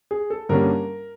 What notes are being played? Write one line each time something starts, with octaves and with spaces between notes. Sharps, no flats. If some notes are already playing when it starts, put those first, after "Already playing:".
G#4
A4
G2 D3 G3 A#3 C#4 A#4